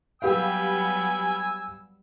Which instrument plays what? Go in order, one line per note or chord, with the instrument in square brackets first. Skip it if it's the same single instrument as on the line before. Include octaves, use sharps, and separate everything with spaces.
[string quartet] F#3 G3 B3 [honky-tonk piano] G4 B4 F5 [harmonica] G#5 E6